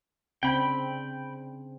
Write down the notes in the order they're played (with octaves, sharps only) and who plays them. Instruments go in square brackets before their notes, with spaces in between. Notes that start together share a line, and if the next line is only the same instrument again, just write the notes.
[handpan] C#3 C4 D4 [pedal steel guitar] G5 B5